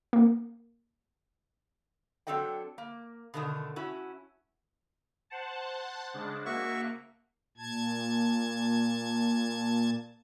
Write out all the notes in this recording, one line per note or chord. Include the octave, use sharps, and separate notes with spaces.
A#3
F#3 C4 D4 A4 D#5 G5
A#3
B2 D3 D#3 A3 D4
C#4 E4 F#4
C5 F#5 A5
C#3 G#3 D4
A#3 F#4 E5 C#6
A#2 A5 G#6